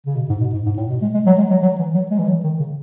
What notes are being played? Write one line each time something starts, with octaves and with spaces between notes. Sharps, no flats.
C#3
B2
G#2
B2
G#2
G#2
A2
B2
G#3
G#3
F#3
G#3
F#3
F#3
E3
F#3
G#3
E3
F#3
D#3
C#3